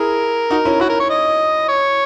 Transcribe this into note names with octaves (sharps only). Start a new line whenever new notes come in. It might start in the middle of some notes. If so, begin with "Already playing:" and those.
Already playing: E4 G#4 A#4
D#4 F#4
C#4 E4
C#4 E4 F#4
A#4
C#5
D#5
C#5